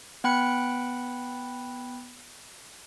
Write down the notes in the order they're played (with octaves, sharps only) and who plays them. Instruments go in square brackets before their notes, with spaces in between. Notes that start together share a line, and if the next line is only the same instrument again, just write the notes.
[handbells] B3 G5 B5 F#6 C#7